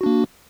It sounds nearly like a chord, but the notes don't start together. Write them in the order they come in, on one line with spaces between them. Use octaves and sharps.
F#4 D4 A#3